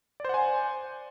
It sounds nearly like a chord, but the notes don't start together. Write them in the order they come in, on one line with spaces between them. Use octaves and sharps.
D5 C5 F#5 G#5